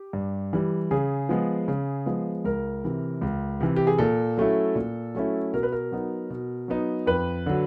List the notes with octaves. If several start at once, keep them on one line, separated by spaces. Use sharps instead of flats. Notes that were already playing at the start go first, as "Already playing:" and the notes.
Already playing: G4
G2
E3 G3
C#3 G#4
F3 G#3 B3
C#3
F3 G#3 B3
C#2 A#4
C3 E3
C#2
C3 E3
G4
G#4
A#2 A4
F#3 A3 C#4 E4
A#2
F#3 A3 C#4 E4
B2 A#4
B4
A#4
F#3 B3 D#4
B2
F#3 B3 D#4
F2 B4
D3 F#3